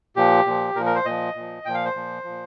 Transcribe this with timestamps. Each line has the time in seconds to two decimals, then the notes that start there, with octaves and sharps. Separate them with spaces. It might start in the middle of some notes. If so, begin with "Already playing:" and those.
0.16 A#2 F3 G4
0.46 A#2 F3
0.75 A#2 A#4
0.80 F3
0.86 A#4
0.95 C5
1.05 A#2 F3 D#5
1.35 A#2 F3
1.65 A#2 F3 G5
1.74 F5
1.85 C5
1.95 A#2 F3
2.24 A#2 F3